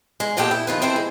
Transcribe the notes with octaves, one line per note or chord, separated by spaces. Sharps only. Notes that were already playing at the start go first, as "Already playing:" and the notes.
G#3
A#2 A#3 B3 G4 A4 G5
E4
D#3 F3 B4
E3 C4 A4 C5
G#3